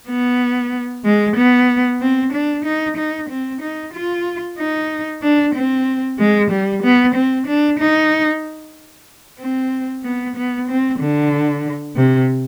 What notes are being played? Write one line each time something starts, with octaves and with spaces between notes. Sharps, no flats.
B3
G#3
B3
C4
D4
D#4
D#4
C4
D#4
F4
D#4
D4
C4
G#3
G3
B3
C4
D4
D#4
C4
B3
B3
C4
D3
C3